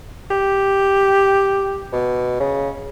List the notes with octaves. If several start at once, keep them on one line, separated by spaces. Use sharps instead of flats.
G4
B2
C#3